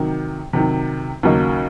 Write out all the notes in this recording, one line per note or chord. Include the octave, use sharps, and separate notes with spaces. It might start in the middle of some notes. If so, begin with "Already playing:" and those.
Already playing: C3 D#3 F#3
C3 D#3 F#3
D#2 C#3 F#3 A#3 D#4